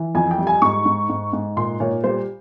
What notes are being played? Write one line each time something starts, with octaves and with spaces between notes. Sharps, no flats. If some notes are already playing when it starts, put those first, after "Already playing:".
Already playing: E3
F2 G#5
G5
G3
G#5
G#2 C#6
G#2
G#2
G#2
A#2 C6
A#2 C#5
G3 C5